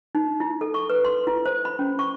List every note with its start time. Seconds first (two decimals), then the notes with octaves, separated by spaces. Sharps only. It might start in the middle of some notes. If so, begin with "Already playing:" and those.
0.15 D#4
0.40 E4
0.61 A4
0.74 C#6
0.89 B4
1.05 C6
1.27 E4
1.45 C5
1.65 B5
1.79 C#4
1.99 C#6